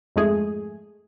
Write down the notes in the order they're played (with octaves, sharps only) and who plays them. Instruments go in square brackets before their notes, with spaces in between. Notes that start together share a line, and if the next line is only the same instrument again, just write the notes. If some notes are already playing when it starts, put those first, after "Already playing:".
[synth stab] F2 G#2 G#3 A3 G#4